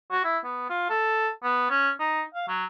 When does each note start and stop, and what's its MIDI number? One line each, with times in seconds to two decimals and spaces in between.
0.12 0.21 66
0.24 0.38 64
0.44 0.67 59
0.70 0.85 65
0.90 1.29 69
1.43 1.67 59
1.70 1.90 61
2.00 2.23 63
2.35 2.48 77
2.48 2.65 54